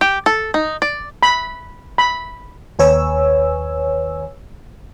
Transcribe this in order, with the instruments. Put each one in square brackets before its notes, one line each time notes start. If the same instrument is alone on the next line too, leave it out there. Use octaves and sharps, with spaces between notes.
[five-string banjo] G4
A4
D#4
D5
[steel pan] B5
B5
[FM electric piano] D#2 B4 C#5 G#5 E6